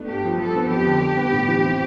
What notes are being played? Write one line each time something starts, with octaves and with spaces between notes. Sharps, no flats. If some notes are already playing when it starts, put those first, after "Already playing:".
Already playing: A3 B3 D4
G2 G4
F3
F3 A4
B3
F2 G4
D3
G3
B3
A2
E3
C4